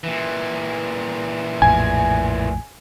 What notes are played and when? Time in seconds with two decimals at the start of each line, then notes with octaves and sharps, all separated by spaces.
0.04 A#2 E3
1.62 A#1 F2 A2 G#5